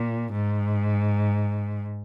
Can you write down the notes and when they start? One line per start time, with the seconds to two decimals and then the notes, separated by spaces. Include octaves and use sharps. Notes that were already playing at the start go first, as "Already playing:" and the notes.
Already playing: A#2
0.32 G#2